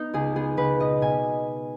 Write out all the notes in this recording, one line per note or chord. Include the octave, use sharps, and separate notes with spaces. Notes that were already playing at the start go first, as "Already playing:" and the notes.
Already playing: B3 D#4
C#2 G#4
B3 G#4
C#2 B4
B2 D#5
B2 G#5